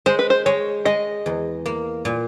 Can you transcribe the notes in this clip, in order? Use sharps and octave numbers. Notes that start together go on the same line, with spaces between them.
G#3 C5
B4
C5
G#3 C#5
G#3 D#5
E2
A#3
A#2